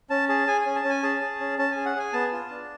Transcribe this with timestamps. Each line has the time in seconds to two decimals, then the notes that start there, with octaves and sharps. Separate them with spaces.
0.10 C#4 A5
0.29 G#4 A5
0.47 G#4 G#5
0.61 C#4 G#5
0.76 A5
0.85 C#4 G#5
1.03 G#4 A5
1.21 G#4
1.40 C#4
1.58 C#4 A5
1.72 G#4 G#5
1.85 F#5
1.96 G#4 G#5
2.13 B3 A5
2.32 F4
2.51 D4